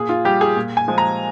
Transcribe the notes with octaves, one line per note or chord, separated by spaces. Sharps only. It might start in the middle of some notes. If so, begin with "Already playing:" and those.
Already playing: A#2 G#4
F4
G3 G4
G#4
A#2
G#5
F3 G#3
A#5